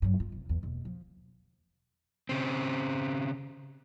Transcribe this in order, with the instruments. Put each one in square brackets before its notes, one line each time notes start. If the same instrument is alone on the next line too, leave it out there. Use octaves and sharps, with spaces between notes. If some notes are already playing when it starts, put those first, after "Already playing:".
[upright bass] G2 F#3
F4
F1
E2
E1 D#2
F3
[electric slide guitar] C#3 C4